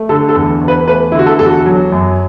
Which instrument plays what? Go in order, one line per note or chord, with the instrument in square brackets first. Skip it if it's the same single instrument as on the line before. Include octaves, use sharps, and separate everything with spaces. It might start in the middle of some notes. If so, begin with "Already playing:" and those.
Already playing: [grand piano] A3
D3 A4
A4
E2
E2
B4
A3 B4
D3 E4
F#4
A4
E2 A4
F#4
F#3
F#2